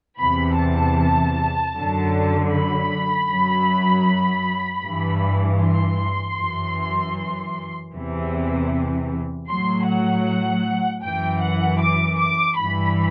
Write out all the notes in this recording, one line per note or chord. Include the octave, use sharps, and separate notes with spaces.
E2 C3 E3 B5
A5
F#2 D3 F#3
B5
F#2 F#3
G2 E3
C6
F#2 E3
E2 C3 E3
A2 F#3 C6
F#5
F#2 E3 G5
F#5
D6
D6
G2 E3 B5